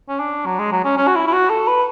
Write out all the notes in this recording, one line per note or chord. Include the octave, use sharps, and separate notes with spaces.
C#4
D4
F#3
G#3
F#3
C#4
C#4
F#4
E4
E4
F#4
A4
B4